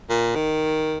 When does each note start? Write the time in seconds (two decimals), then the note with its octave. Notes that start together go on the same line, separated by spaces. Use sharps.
0.10 A#2
0.35 D#3